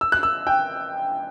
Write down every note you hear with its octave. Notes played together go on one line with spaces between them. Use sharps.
E6
F#6
E6
G5